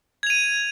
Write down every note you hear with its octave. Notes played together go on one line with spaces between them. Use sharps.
G#6 D#7 F7